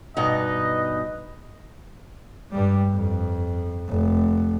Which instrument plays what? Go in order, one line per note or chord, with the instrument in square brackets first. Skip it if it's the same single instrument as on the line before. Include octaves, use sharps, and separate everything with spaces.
[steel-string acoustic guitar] G2 B2 D#4 [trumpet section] B4 D#5
[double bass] G2 G3
F2
F1